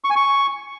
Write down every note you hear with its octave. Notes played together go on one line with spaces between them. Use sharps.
C#6
G#5
C#6